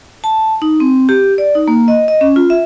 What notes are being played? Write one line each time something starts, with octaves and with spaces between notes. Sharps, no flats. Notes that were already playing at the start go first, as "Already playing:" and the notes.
A5
D#4
C4
G4
D5
D#4
A#3
D#5
D#5
C#4
F4
E5